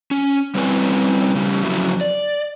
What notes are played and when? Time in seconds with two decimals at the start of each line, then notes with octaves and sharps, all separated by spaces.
0.11 C#4
0.55 G3 C4 C#4 E4 B4 G#5
1.35 C#3 G3
1.63 F2 C#3 F#3 E4
2.01 D5